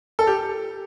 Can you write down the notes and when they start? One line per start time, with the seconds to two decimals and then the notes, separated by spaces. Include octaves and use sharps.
0.19 A4
0.27 G4